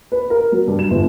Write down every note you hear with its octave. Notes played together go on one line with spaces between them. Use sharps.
B4
A#4
F#3
G2
E7
G1